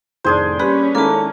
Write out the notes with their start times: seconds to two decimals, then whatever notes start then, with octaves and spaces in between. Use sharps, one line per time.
0.24 F1 A2 D#3 D4 G#4 C5
0.59 G3 A#3 C#4 G4 B4
0.95 D#3 G#3 A#3 E4 A4 A5